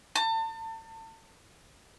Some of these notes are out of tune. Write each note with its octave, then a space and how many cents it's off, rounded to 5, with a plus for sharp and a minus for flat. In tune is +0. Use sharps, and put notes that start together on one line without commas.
A5 +35